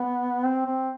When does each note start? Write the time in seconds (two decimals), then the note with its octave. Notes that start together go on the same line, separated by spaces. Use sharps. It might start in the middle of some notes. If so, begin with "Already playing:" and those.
Already playing: B3
0.45 C4
0.66 C4